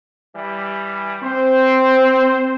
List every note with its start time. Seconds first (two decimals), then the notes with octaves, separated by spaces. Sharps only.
0.36 E3 G3
1.23 C4 C5